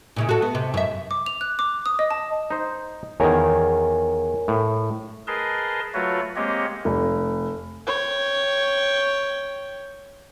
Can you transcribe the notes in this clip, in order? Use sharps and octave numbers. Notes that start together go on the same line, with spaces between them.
A#2 C#3 E4
F#4 A4
B3
C3
F#2 E5
D6
F7
F#6
D6
D#6
D#5
A5
D#4 C5
E2 D#3 A#4 C#5 G#5
A2
G#4 A#4 B4 D#5 A5 C6
F#3 A3 F4 F#4 B4 C#5
G#3 A#3 C4 G4 C#5 D#5
F1
C#5 G5